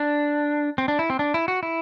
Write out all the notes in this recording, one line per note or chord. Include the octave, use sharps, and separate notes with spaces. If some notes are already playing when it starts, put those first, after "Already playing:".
Already playing: D4
C4
D4
E4
C4
D4
E4
F#4
E4